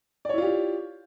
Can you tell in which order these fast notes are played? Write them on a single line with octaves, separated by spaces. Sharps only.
D5 C#5 E4 F4 G4